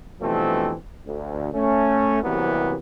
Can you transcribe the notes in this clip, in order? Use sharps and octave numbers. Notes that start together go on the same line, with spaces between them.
G2 B2 E3 F3 A3 C4
D2
A3 C#4
C2 C3 E3 F#3 A#3 B3